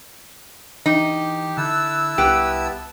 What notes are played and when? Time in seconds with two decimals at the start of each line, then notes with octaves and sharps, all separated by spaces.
0.86 E3 D#4 G4
1.57 D3 E4 A5 E6 F#6
2.18 C2 B3 G4